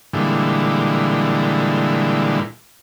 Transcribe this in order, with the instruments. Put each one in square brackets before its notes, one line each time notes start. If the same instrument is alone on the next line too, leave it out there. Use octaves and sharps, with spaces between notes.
[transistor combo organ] A#2 D3 E3 G3 G#3